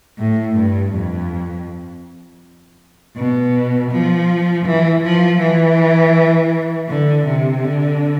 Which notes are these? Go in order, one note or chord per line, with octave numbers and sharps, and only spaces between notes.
A2
G2
F2
B2
F3
E3
F3
E3
D3
C3
D3